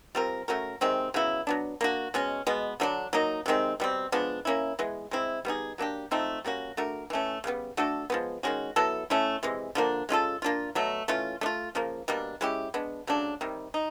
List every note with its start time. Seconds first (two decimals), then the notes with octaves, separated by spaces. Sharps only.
0.15 G3 C4 F4 A#4
0.48 A3 C#4 F#4 A#4
0.81 C3 D#3 G#3 C4
1.14 C#3 F#3 B3 E4
1.47 F#3 B3 D4
1.81 A#3 D4 F#4
2.14 B2 G#3 C#4
2.47 B2 G#3 B3
2.80 D3 F#3 A3 D4
3.13 F#3 A#3 D#4
3.46 C3 D#3 G#3 C4
3.80 B2 G3 C4
4.12 F3 G#3 B3 D4
4.45 A#3 C#4 E4
4.79 E3 G#3 B3
5.11 G#3 C4 E4
5.45 G3 B3 D#4 G#4
5.78 F#3 A#3 D4 G4
6.11 F3 A3 C4 D#4
6.44 G3 A#3 C#4 F#4
6.77 A3 D4 F#4 A#4
7.10 E3 A3 C#4
7.44 C#3 E3 G3 B3
7.77 A3 D4 F#4 A4
8.10 F3 G#3 B3
8.43 D#3 G#3 C#4 F#4
8.76 F#3 B3 E4 A4
9.10 A3 C#4 E4
9.43 C3 E3 G#3
9.75 D3 F3 A#3 D4
10.09 G#3 C#4 F4 A4
10.42 A#3 D4 F4
10.75 B2 F#3 A3
11.08 E3 A3 C#4 F4
11.41 A3 D4
11.46 F4
11.75 C#3 F3 A#3
12.08 B2 G3 A#3 D4
12.41 G#3 C#4 E4 G4
12.74 G#3 B3 D4
13.07 C#3 F#3 A3 D4
13.41 C3 D#3 G3
13.74 D#4